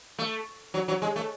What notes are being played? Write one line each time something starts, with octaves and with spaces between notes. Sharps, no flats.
A3
F#3
F#3
G#3
A3